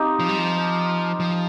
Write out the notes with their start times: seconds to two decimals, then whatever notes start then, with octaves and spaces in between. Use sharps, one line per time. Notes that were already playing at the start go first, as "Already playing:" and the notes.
Already playing: C4 D#4 G4
0.20 F3
0.29 G3
0.38 F3
1.20 F3